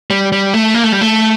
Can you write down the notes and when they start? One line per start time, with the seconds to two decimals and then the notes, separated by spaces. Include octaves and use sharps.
0.10 G3
0.32 G3
0.54 A3
0.74 A#3
0.84 A3
0.92 G3
1.01 A3